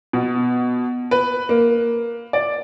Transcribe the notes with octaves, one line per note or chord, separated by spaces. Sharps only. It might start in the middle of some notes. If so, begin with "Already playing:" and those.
B2
B4
A#3
D5